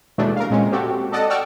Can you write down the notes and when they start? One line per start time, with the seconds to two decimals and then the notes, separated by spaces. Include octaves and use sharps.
0.18 D#2 B2 E3 G#3 A3 D4
0.36 A#4 F5
0.50 A#2 G#3 C4 C#4
0.72 C4 F#4 G4 A4
1.12 A4 D5 D#5 F#5 A5
1.30 D5 F#5 G5 C#6 E6 F6